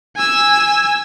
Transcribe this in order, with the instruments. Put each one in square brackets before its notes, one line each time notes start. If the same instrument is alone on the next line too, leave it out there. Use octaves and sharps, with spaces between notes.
[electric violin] G#5 E6